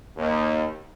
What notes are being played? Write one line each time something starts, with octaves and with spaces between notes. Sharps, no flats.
D#2